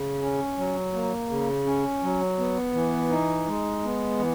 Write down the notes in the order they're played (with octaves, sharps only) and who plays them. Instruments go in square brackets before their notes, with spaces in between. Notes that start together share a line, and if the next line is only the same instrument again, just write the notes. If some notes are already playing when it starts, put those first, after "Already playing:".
Already playing: [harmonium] C#3
C#4
F#3
A#3
C#3
C#4
F#3
B3
E3
D#4
G#3
B3
E3